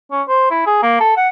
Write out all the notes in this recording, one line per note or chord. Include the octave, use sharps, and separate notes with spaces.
C#4
C5
E4
G#4
A#3
A4
F#5